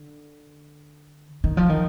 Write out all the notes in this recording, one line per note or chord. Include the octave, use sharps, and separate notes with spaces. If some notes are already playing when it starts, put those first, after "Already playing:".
Already playing: D3
D#3
F3
D#3